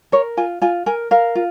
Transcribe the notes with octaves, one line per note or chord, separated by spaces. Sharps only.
A#4 C#5
F4 G#5
F4 G#5
A#4 G#5
A#4 F5
F4